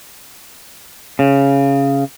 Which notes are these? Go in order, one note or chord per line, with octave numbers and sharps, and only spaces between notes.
C#3